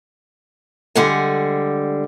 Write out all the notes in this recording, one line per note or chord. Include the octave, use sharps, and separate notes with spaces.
D3 G3 G#3 F#5 G#5